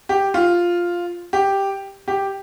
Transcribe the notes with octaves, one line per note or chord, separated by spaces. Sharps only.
G4
F4
G4
G4